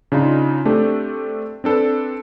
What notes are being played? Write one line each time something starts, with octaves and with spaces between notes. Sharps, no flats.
C#3 D4 D#4 F4
A3 C4 D4 G4 A4
C4 D4 A4 B4